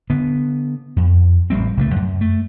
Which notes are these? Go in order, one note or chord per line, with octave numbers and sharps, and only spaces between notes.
D3 B3
F2
A1 D3 G3 C4
C2 C#3 F3 A3
F#2
A3